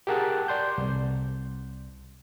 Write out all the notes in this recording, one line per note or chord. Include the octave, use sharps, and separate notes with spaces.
G4 G#4 A#4 F#5 A5 F#6
D5 C6 G6
C2